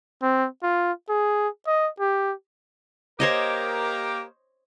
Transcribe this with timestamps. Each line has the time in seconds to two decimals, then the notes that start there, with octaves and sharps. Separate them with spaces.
0.22 C4
0.63 F4
1.09 G#4
1.67 D#5
2.00 G4
3.20 A#3 G4 A#4 C5 C#5 D#5